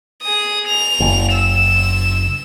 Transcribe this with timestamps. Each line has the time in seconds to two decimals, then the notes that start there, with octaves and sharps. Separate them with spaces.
0.22 G#4 D#6
0.67 F7
1.00 F#1
1.33 E6